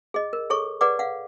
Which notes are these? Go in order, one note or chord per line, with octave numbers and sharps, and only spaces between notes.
G#4 D#5
A#4
G#4 A4 C#5 C#6
G#4 B4 D5 F#5 D6
F5 F#5